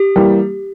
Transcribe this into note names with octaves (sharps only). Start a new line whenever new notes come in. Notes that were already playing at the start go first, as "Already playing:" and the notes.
Already playing: G4
E3 G3 A#3